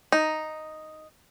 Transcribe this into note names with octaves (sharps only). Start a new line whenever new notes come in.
D#4